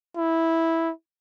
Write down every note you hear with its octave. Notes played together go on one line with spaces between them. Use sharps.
E4